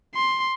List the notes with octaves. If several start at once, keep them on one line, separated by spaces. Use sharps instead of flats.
C6